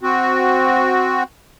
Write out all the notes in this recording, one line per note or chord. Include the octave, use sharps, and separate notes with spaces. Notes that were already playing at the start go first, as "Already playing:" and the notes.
C4 F#4